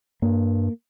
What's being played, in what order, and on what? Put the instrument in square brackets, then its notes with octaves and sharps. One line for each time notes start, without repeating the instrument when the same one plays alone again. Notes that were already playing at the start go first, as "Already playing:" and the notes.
[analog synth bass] G2 [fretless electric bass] A#3